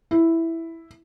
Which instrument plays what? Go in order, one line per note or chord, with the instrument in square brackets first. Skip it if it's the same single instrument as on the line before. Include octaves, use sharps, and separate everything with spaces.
[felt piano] E4